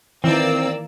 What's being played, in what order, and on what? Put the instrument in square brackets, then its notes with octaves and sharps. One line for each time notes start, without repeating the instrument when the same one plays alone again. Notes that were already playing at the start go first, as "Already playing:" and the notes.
[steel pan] D#3 E3 [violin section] A#3 D5 E6 [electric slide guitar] C4